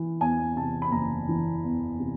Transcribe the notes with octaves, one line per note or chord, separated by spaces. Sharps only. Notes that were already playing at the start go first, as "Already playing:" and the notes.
Already playing: E3
E2 G#5
C3 A5
B5
F#1 A#5
E3
E2
C3